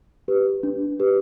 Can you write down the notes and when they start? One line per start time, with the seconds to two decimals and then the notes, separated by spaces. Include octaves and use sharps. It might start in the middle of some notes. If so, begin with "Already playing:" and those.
0.28 G4 B4
0.63 D4
1.00 G4 B4